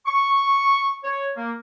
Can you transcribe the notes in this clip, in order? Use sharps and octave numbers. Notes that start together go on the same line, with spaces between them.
C#6
C#5
A#3